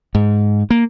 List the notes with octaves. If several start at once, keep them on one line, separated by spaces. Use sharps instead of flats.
G#2
A#3